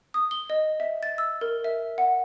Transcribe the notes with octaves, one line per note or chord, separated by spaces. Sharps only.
D#6
G7
D#5
E5
A6
E6
A#4
E5
F#5